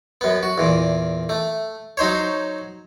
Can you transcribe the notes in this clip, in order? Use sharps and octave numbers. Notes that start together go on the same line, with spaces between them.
F#2 B3
F#4
E2 A#2
A3
F#3 D#4 C5 C#5